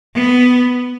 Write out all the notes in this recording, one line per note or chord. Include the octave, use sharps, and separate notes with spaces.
B3